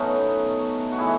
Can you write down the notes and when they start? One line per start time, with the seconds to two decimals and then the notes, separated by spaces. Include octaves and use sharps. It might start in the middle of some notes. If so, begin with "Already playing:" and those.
Already playing: B2 F#3 A3 B3 C#4 D#4 F#4
0.92 F#4
0.98 A2 E3 E4 G#4